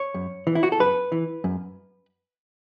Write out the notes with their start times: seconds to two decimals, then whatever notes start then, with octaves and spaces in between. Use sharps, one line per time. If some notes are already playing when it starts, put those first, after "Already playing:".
Already playing: C#5
0.14 F#2
0.47 E3
0.55 E4
0.63 F#4
0.72 A4
0.80 F#2 B4
1.12 E3
1.44 F#2